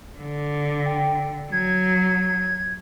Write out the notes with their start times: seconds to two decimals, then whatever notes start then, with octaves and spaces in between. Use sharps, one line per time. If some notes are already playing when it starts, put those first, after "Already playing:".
0.18 D3
0.86 G5
1.52 F#3 G#6